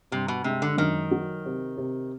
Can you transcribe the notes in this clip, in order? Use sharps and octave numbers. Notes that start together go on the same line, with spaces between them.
G2 C3
B2
C3 G#3
D3
F#2 D#3
F#3
C3
C3